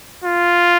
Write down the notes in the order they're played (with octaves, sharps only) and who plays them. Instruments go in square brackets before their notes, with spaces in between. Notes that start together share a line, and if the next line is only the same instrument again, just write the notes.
[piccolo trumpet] F4